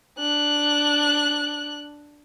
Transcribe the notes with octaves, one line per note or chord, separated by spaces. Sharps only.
D4 F#6